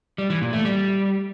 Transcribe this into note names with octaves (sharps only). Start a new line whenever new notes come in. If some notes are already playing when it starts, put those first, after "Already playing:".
G3
E3
A#2
A3
G3